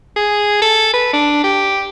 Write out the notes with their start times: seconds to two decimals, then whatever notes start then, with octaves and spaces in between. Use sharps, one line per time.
0.17 G#4
0.62 A4
0.94 B4
1.13 D4
1.44 G4